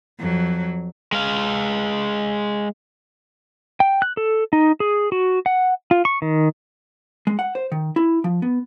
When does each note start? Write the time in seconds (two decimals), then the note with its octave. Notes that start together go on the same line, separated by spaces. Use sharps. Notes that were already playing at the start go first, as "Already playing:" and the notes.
0.19 F2 F#3
1.12 G#3 F5
3.80 G5
4.02 F#6
4.17 A4
4.53 D#4
4.80 G#4
5.12 F#4
5.46 F#5
5.91 F4
6.05 C#6
6.22 D#3
7.27 G#3
7.39 F#5
7.55 C5
7.72 D#3
7.96 E4
8.24 F3
8.42 B3